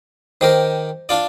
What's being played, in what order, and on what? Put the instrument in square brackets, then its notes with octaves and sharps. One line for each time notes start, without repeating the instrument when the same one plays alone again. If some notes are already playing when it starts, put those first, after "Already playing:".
[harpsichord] D#3 G4 A#4 [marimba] C5
[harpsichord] D4 F4 D5